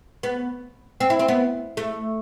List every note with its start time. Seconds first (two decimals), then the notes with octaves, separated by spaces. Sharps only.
0.23 B3
1.00 C4
1.10 E4
1.19 C4
1.28 B3
1.77 A3